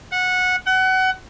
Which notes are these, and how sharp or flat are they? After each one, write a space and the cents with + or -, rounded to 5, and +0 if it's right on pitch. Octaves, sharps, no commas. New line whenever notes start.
F#5 -15
F#5 +25